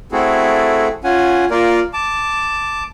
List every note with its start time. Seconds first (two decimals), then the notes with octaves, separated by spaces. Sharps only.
0.12 A3 C4 E4 F#4 G#4 A4
1.04 C#4 F4 F#5 G#5
1.51 A#3 F4 A#4 D5
1.93 A5 D6